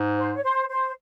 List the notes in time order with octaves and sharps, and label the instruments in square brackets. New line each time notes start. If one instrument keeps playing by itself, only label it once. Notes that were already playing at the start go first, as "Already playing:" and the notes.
Already playing: [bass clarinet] G#2
[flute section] C5
C#5
C5
C5